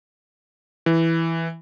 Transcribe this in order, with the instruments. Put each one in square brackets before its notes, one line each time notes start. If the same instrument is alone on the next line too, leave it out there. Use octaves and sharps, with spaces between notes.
[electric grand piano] E3